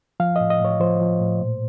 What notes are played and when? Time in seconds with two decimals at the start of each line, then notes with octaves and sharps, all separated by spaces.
0.20 F3 F5
0.36 A2 D#5
0.50 D#5
0.60 A2 C#5
0.80 F3 C5
1.01 F3
1.21 A2
1.41 A#2